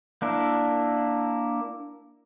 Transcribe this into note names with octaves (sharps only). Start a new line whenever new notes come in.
A#3 D4 E4